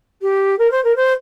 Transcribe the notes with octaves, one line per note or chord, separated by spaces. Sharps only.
G4
A#4
C5
A#4
C5